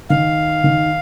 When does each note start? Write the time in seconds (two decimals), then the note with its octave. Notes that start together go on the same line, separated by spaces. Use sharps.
0.09 D#3 F5
0.64 D#3